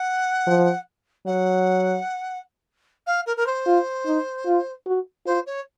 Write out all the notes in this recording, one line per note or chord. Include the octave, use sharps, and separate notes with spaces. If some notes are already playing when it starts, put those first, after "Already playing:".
Already playing: F#5
F3
F#3 F#5
F5
A#4
A#4
C5
F4
D#4
F4
F#4
F4 C5
C#5